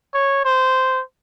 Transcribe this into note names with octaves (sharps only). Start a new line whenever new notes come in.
C#5
C5